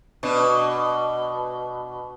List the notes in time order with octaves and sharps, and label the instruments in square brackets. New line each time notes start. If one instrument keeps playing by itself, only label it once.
[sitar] B2 D4